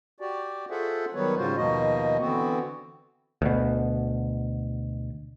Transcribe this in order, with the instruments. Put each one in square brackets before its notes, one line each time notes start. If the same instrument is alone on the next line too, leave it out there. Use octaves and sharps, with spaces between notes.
[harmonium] F#4 G4 D5
F4 G#4 A4 C5 E5 F#5
D#3 F#3 G3 B3 B4 C#5
G#2 C#3 G3 F4 F#4 C5
D#2 B2 F3 A#3 F#4 D#5
D3 E3 B3 C4 F#4
[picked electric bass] D2 B2